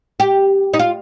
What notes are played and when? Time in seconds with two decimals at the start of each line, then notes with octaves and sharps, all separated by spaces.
0.20 G4
0.74 D#4
0.79 F4